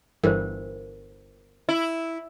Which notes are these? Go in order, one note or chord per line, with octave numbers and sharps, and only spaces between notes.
G1 G2 E3 A#4 C5
E4